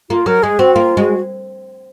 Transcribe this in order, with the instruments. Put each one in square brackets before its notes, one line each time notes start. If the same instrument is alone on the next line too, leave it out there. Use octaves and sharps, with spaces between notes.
[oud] A#3 [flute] F4
[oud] F#3 [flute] A#4
[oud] G#3 [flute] G#4
[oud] C4 [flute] F#4
[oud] A#3 [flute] F4
[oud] G#3 [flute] F#4